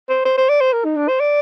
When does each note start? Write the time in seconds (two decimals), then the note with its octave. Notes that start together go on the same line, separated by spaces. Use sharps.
0.09 C5
0.25 C5
0.37 C5
0.49 D5
0.61 C5
0.73 A#4
0.85 D#4
0.96 D4
1.08 C5
1.20 D5